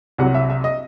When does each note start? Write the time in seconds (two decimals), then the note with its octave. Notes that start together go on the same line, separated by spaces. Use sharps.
0.18 C2 C3 F#3 F#5
0.34 E5
0.50 E5
0.64 D#5